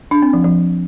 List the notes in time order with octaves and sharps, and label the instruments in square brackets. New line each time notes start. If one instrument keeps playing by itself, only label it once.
[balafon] D4
C4
F3
F3